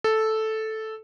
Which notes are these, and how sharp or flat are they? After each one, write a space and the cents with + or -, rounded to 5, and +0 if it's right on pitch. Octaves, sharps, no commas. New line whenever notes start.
A4 -5